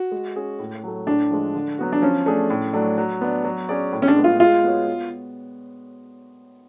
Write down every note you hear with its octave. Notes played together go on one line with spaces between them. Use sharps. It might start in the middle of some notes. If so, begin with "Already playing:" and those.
Already playing: F#4
G#3
C#4 G#4
A2
F#3 A3
A2 D4
F3 G#3
D3
F#3 B3 F#4
D4
F3 C#4
A3 D4 G#4
A2
F#3 A3 D4
F#3
B3 D4
F#3
C#4 G#4 D5
A2
C#4
D4
G#3 B3
F4
G#3 F4
B3 F#4 C#5
B3